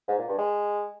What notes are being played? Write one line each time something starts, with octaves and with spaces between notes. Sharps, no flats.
G#2
A#2
G2
G#3